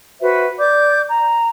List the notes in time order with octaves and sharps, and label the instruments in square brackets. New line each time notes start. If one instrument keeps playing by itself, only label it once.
[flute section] F#4 B4 C5 E5
D5 D6 G6
A#5